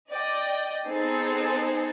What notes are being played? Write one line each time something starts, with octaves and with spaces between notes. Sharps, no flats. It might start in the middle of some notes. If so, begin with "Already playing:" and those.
D5 D#5 G5
B3 C4 D#4 G#4 A4 C5